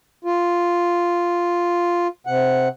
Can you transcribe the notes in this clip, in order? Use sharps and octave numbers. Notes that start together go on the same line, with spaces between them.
F4
C3 F#5